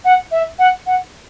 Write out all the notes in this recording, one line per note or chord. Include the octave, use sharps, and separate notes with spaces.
F#5
E5
F#5
F#5